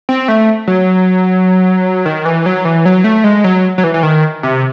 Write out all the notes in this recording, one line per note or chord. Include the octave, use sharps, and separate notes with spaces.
C4
A3
F#3
D#3
E3
F#3
E3
F#3
A3
G#3
F#3
F#3
E3
E3
D#3
C3